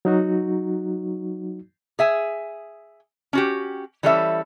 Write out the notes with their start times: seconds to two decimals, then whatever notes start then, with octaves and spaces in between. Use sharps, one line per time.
0.05 F#3 D#4 F#4
1.99 G#4 E5 G#5
3.33 C#4 F#4 G4
4.03 E3 G3 C#4 A4 C#5 E5